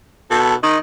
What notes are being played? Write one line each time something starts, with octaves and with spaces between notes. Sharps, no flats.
B2 A4
D#3 D#5